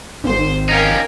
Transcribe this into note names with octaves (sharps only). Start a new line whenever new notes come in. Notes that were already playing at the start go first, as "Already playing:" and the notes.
G#1 C5
C#4 D#4 A#4 F5 G5